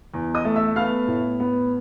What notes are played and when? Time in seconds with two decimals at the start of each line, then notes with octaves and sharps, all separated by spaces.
0.14 E2
0.34 D#5 D#6
0.45 A3
0.56 E5 E6
0.76 B3 F5 F6
1.08 A2
1.40 B3